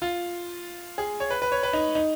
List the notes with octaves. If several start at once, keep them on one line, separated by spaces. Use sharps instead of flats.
F4
G#4
C#5
B4
B4
C#5
B4
D#4
D#4